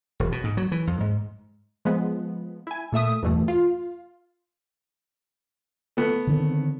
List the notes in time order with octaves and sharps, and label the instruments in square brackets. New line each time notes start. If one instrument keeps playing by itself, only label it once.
[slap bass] E1
B2
G#2
F#3
E3
F2
G#2
[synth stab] F3 G#3 B3
E4 G#5
A#2 A3 E5 D#6
E2 G2 B2 E3 A3
F4
[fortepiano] A3 B3
[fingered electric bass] D3 D#3 C4